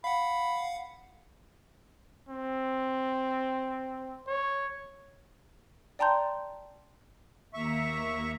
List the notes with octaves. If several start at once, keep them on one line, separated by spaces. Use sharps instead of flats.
F5 F#5 B5
C4
C#5
D5 G5 A5 A#5 C6 G6
D#2 A#3 E5 A#5 C#6